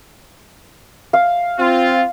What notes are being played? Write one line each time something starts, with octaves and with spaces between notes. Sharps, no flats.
F5
C4 F4